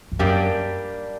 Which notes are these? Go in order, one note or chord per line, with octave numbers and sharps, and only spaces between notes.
G2
F#2 G3 A#3 D4 G4